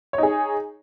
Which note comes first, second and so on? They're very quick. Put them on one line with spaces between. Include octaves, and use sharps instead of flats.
C#5 D#4 G#4